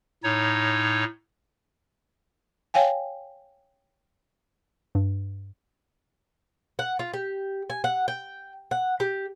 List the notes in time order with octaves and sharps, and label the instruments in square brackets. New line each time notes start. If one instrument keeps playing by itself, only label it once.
[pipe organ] A2 D#4 C#5
[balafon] C#5 F5 G5 G#5
[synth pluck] G2
[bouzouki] F#5
F4
G4
G#5
F#5
G5
F#5
G4